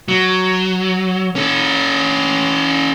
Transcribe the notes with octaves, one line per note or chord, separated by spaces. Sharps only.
F#3
C#4 A4